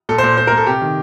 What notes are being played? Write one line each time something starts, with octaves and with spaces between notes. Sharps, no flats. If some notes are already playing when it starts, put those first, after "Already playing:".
A#2 A4
C5
A#2
A#2 C5
A#4
A#2
A4
C3 G4
D#3